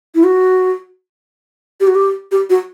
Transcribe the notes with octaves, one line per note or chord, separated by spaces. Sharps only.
E4
F#4
G4
F#4
G4
G4
F#4